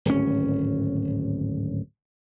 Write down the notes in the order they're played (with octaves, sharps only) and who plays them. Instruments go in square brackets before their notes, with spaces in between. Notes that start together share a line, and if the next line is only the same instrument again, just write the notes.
[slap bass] D1 G#1 C#4